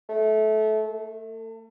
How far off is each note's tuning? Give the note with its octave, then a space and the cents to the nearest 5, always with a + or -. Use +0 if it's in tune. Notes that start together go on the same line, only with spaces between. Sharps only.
A3 -20
A3 +35